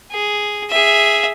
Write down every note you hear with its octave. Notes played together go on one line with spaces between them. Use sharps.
G#4
G#4 E5